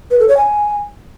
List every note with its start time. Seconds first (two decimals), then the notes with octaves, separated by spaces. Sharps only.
0.11 B4
0.20 A4
0.28 C#5
0.37 G#5